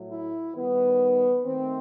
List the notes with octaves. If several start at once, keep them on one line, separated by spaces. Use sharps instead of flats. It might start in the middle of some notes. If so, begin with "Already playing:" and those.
Already playing: A2 F#3 A3
E4
D#3 G3 B3
D#3 A3 C4